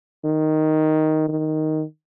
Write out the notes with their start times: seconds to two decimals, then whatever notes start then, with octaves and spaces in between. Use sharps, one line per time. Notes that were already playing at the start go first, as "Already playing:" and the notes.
0.25 D#3
1.29 D#3